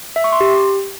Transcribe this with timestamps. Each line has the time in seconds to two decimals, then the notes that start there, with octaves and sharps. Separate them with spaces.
0.16 E5
0.24 C#6
0.32 C6
0.41 G4